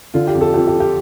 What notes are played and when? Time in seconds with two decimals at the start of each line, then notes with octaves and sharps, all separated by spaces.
0.14 D3 F4
0.28 G4
0.34 F2
0.41 A4
0.54 F2 G4
0.68 G4
0.74 F3
0.80 G4